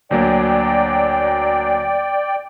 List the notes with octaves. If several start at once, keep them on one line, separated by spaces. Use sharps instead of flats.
D2 F#3 A#3 D5 G5